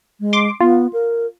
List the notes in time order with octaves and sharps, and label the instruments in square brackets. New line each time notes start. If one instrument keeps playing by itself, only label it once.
[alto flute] G#3
[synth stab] C6 D6
[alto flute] B3 [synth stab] F4
[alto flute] A#4